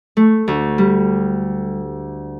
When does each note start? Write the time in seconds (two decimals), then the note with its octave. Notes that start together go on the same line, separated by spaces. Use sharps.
0.17 A3
0.48 D2
0.78 G3